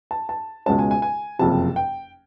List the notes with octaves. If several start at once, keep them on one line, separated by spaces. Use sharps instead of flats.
A5
A5
C#2 B2 G#3 C#4 A5
G#5
G#5
G#5
F#1 F2 C3 A5
G5